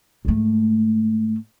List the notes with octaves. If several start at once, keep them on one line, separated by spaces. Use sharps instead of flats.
G#2 A3